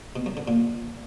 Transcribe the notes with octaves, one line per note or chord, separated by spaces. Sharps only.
B2
F#2
D3
A#2